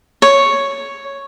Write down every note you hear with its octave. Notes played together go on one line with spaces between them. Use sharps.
C#5